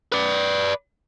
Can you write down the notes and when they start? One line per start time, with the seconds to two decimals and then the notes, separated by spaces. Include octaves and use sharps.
0.12 B4 D5